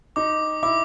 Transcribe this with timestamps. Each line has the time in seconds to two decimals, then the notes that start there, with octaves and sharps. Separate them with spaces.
0.16 D#4 D6
0.63 E4 D6